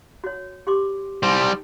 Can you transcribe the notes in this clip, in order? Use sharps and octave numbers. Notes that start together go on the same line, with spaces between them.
F#4 C#5
G4 C6 D6
G3 D#4 C5